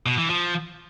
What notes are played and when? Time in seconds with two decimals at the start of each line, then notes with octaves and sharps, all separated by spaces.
0.06 B2
0.18 E3
0.30 F3